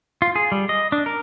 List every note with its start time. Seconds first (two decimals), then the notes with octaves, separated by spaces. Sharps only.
0.22 F4
0.36 G#4
0.52 G3
0.69 D#5
0.92 D4
1.06 A#4